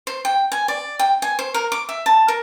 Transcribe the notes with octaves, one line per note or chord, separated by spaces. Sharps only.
C5
G5
G#5
D5
G5
G#5
C5
A#4
D6
E5
A5
A#4